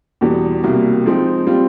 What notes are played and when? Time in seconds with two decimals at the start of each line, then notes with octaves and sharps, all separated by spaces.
0.21 E2 B2 G3 B3
0.63 C2 B2 G3 A#3
1.06 F3 G#3 C4 D#4
1.47 G3 C4 F4